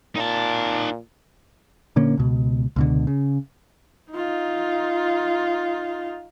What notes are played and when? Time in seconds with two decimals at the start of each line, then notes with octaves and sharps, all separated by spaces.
0.16 A#2 D#4 A5
1.96 A#2 D3 A#3 C#4
2.17 C#2 B2
2.76 C#2 B2 D3
3.07 C#3
4.11 D#4 F4